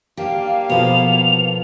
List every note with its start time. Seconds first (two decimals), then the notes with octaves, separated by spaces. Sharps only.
0.17 A#3 D4 G4 F5
0.70 B2 F3 B3 A4 F7